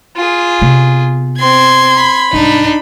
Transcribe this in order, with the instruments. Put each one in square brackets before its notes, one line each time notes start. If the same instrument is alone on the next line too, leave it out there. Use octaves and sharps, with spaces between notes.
[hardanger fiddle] F4 G#4
[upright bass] C3 B3
[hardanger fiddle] C4 [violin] C6 G#6
[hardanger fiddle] B5
[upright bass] C2 G#2 [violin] D4 D#4